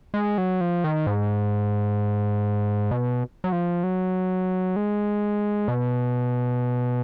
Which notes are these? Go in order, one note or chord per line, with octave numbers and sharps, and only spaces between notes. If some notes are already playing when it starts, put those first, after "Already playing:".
G#3
F#3
F3
D#3
G#2
B2
F#3
F3
F#3
G#3
B2